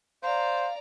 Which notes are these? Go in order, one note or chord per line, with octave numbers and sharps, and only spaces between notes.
C5 D5 F5 A#5